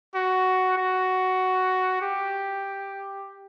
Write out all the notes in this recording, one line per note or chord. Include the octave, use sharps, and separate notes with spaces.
F#4
F#4
G4